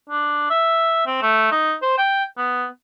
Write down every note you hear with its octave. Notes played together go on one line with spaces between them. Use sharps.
D4
E5
C4
A3
D#4
C5
G5
B3